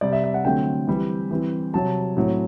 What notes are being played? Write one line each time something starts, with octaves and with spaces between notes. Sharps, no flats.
C3 G3 C4 D5
E5
E5
F#5
D3 F#3 A3 C4 G5
E3 G3 C4
E3 G3 C4
C3 F#3 C4 A5
A2 F#3 C4